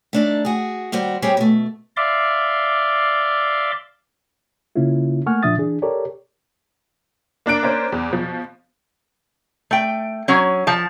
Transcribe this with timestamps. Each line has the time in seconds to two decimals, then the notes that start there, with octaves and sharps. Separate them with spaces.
0.13 A3 D4 D#4
0.45 F#4 G#4
0.92 D#2 G3 F#4 C5
1.22 G3 C4 G4 G#4 C#5
1.37 B2 A3
1.97 D5 E5 F5 C6 D6
4.76 C#3 A#3 C#4 E4 F4
5.26 A3 A#3 F#5 G#5 C#6 F6
5.43 A#2 F3 D4 E5 D#6 A6
5.58 E3 D4 G#4
5.82 G4 A4 A#4 C#5 D5
7.46 A#3 D4 F#6 D7
7.63 A#3 C#4 D4 C5
7.92 E2
8.11 B2 F3
9.71 A3 G5
10.28 F#3 C#4
10.67 F3 A5